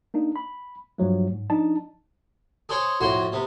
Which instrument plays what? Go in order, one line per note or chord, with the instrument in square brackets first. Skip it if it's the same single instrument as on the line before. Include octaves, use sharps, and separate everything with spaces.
[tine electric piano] A#3 D4 D#4
B5
G2 F3 F#3 A3
G#2
F3 D4 D#4 A5
[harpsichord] G#4 A4 C5 C#5
F2 A2 F#4 C6
C3 B3